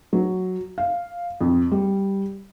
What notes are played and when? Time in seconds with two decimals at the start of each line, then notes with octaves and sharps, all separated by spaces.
0.13 F#3
0.78 F5
1.41 F2
1.72 G3